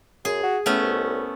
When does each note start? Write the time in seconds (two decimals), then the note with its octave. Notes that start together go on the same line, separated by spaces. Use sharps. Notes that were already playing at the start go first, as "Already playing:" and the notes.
0.25 F#2 G#4
0.43 F#4
0.66 A2 A3 B3 C#4
0.83 C2